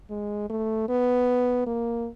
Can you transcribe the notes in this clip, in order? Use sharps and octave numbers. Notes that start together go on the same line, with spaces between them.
G#3
A3
B3
A#3